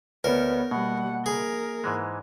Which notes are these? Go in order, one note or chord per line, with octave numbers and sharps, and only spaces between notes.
D2 B3 A#4 B4 C#5
B2 G3 A#3 F#5
G#4 A#4
G#2 E3 G#3